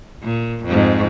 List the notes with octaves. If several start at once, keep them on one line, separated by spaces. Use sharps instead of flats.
A#2
F2 G#2